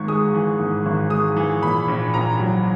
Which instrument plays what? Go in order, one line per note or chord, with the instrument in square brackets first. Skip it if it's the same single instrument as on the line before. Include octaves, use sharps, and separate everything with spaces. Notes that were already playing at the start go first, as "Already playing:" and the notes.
Already playing: [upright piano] G#1 G#2 C#6
G#3 D#6
E3
G#2
G#1
G#3 D#6
E3
A#2 B5
A#1
A#1 A#5
F#3